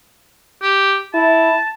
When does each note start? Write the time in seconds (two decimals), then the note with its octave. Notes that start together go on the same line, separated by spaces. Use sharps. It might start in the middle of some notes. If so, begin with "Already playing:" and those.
0.62 G4
1.14 E4 A5